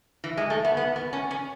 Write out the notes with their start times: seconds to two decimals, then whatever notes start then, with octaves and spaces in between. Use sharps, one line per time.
0.24 E3
0.37 G#3
0.50 A3
0.65 B3
0.77 B3
0.96 B3
1.13 C#4
1.31 C#4